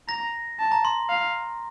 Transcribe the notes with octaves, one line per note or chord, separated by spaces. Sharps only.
A#5 A#6
A5
A#5
C6
F5